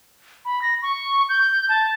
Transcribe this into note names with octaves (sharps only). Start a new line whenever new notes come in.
B5
A#6
C#6
G6
A5